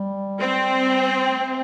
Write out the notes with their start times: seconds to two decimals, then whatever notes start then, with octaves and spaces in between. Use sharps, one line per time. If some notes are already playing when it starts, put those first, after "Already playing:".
Already playing: G3
0.38 C4
1.27 A3